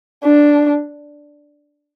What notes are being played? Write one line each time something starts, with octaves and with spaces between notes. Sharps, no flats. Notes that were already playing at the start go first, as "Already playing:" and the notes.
D4